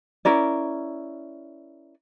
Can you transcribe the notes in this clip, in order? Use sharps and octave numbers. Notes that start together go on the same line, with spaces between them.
C#4 E4 A#4 D5